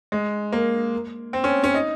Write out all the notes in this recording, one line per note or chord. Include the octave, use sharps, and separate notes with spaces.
G#3
A#3
C4
C#4
C#4
D#4